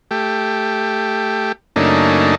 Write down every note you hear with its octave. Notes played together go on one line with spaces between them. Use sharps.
A3 G4
F#2 C#3 A3 A#3 D4 D#4